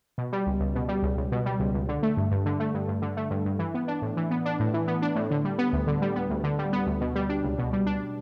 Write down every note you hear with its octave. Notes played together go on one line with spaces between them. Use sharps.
B2
G3
C#2
C#2
B2
G3
C#2
C#2
B2
G3
C#2
C#2
D3
A3
G2
G2
D3
A3
G2
G2
D3
A3
G2
G2
E3
B3
D4
A2
E3
B3
D4
A2
E3
B3
D4
A2
D3
G3
B3
D2
D3
G3
B3
D2
D3
G3
B3
D2
B2
G3
D4
C#2
B2
G3
D4